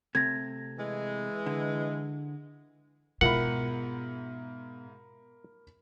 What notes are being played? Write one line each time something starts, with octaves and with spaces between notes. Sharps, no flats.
C3 A3 G#6 A#6
E3 G#3
D3
G#2 B2 E4 F4 A#4 F#5 B5